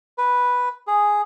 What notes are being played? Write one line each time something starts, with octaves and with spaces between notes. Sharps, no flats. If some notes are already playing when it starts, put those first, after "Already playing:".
B4
G#4